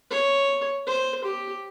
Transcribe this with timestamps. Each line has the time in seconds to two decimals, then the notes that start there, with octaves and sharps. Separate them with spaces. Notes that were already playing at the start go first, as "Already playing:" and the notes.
0.11 C#5
0.87 C5
1.24 G4